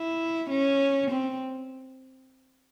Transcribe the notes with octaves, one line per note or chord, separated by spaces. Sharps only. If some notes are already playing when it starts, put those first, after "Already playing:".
Already playing: E4
C#4
C4